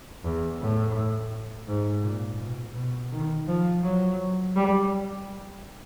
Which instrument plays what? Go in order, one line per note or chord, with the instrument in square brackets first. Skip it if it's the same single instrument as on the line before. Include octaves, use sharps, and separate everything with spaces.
[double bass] E2
A2
G#2
A#2
B2
B2
D#3
F3
F#3
G3